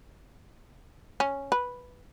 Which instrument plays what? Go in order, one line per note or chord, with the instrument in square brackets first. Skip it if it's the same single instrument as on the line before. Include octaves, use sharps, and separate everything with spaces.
[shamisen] C#4
B4